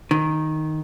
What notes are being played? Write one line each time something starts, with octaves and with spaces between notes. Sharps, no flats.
D#3